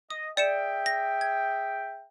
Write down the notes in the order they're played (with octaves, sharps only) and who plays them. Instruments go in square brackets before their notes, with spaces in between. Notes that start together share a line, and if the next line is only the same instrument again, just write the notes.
[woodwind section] D#5 [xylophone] D#6
[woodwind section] G#4 E5 G5 [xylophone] D5 C#7 E7
[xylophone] A#6
G#6